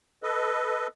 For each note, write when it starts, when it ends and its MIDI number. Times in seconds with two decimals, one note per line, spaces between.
0.23 0.87 69
0.23 0.87 71
0.23 0.87 75